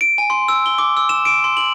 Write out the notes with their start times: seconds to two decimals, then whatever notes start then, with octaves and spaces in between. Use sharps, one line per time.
0.01 D7
0.18 G#5
0.30 C6
0.48 E6
0.66 G7
0.78 D6
0.97 E6
1.09 E7
1.25 D7
1.44 C6
1.57 F#7